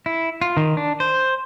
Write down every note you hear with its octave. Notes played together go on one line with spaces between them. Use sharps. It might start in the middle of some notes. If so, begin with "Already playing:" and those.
E4
F4
D#3
D4
C5